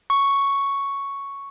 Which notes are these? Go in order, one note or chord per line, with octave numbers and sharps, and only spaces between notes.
C#6